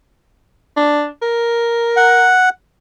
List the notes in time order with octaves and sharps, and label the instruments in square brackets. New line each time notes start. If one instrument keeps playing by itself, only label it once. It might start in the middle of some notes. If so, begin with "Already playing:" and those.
[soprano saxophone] D4
A#4
[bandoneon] F#5